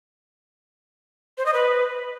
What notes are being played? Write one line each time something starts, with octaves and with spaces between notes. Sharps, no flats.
C5
D#5
B4